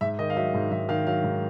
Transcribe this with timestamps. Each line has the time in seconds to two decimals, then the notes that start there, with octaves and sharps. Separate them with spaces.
0.01 G#2 E5
0.19 D#3 D#5
0.30 F5
0.36 F#3 E5
0.54 G#2
0.71 G#2 E5
0.89 D#3 F5
1.07 F#3 F5
1.24 G#2